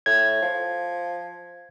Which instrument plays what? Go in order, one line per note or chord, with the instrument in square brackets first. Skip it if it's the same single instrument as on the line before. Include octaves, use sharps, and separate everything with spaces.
[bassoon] A2 [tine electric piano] G#6
[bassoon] F3